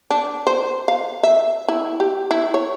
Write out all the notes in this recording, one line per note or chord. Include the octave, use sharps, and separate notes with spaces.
D4
C5
F5
E5
E4
G4
E4
C#5